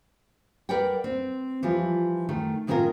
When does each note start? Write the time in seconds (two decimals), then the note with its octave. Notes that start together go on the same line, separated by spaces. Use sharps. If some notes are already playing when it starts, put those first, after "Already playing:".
0.69 A#4 B4 D5 F#5 G5
1.04 C4
1.63 E3 F3 G3 F4
2.29 D#3 A3
2.67 A2 D#3 B3 C#4 F4 A#4